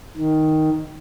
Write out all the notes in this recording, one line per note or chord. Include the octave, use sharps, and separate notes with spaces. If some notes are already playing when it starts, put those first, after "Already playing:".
D#3